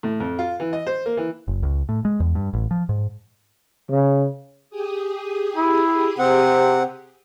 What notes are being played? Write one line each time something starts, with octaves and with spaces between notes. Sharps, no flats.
A2
F2
F4
E3
D#5
C5
A#3
E3
F#1
C#2
A2
G#3
E2
G2
A1
F3
G#2
C#3
G4 G#4 D#6
E4
C3 C4 F#5